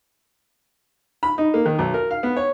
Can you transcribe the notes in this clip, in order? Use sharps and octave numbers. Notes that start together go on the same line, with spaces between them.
B5
D#4
A#3
D#3
B1
A#4
F5
B3
C#5